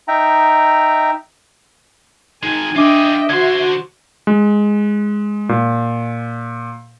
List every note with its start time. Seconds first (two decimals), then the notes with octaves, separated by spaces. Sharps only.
0.08 D#4 E5 G5 A#5
2.43 D#3 G#3 D#4 G#5
2.76 D4 F4 G#4 D#5 E5 G5 D6 D#6
3.29 D3 F#4 C5 C6 G#6
4.27 G#3
5.49 A#2